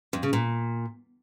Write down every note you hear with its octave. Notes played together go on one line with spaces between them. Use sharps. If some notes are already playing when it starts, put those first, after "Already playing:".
F2
C#3
A#2